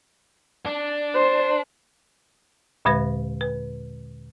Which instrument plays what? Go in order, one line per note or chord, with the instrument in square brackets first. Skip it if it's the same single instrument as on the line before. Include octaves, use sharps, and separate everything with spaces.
[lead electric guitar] D4
[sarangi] C5
[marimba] D#2 A#2 D3 G#3 B4 A#6
B4